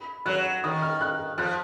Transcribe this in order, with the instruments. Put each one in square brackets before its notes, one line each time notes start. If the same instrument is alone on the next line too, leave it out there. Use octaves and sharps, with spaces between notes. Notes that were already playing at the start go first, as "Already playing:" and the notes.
Already playing: [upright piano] B5
[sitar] F#3 [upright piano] F#6
[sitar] D#3 [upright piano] D#6
[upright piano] F6
F#6
[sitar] F3 [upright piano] F#6